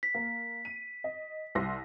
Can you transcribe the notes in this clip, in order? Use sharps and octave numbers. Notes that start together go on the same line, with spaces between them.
B6
A#3
D#7
D#5
C2 C6 A#6